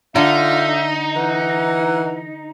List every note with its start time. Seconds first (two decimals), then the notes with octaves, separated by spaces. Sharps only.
0.16 D3 D#4 F4 E5
1.16 E3 F#5